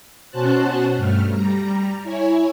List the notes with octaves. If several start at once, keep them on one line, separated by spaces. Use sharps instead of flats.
B2 C#4 F#4 C5 A5 F#6
G2 A3 F6
G3 A#5
E4 C#5 G#5